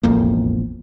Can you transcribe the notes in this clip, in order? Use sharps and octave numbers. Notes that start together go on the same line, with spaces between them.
E1 A1 F2 A#3